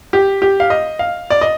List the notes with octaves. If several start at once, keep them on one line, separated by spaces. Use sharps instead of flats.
G4
G4
F5
D#5
F5
D5
D#5